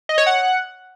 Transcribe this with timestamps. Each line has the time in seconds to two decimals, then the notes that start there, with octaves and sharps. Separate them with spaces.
0.09 D#5
0.18 C#5
0.26 F#5